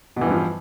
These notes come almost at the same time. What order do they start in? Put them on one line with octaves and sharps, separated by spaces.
B2 E3 G2 F3